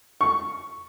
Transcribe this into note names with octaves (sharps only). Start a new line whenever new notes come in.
C#6